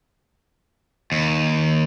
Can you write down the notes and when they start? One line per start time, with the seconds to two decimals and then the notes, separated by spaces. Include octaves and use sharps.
1.12 D#2